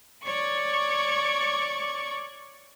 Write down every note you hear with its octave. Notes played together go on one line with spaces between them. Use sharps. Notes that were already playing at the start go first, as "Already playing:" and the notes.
C#5 D5 C#6 D6